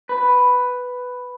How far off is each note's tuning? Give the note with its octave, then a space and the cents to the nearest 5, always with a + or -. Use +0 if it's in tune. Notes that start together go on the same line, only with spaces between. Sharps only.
B4 +5